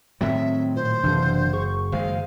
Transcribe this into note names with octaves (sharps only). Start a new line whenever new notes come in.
A2 D#3 F#3 C4 E5
A#2 C5
F#1 C3 E3 D4
G#4 C#6
F#1 D#3 G#3 C5 F5